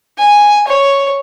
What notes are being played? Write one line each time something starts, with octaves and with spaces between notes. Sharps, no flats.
G#5
C#5